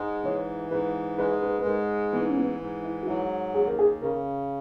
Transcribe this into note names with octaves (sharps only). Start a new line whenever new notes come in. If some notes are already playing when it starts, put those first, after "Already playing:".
Already playing: G#2 G#3
E3 C#5
G#2 B4
G#3 B4
B4
B4
G#2 A#4
E3 B3
D#4
C#4
B3
G#2
E4
F#4
F#3 E4
D#2 G#4
A#4
G#4
C#3 A#4